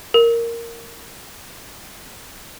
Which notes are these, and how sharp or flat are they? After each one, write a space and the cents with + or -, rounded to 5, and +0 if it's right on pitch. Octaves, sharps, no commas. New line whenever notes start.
A#4 -5